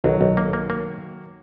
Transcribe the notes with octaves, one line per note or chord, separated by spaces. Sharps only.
B1 D#3 F#3
B1
A#3
A#3
A#3